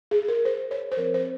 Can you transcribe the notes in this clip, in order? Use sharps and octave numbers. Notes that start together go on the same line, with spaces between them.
G#4
A#4
C5
C#5
C5
F3 C4 A#4
C5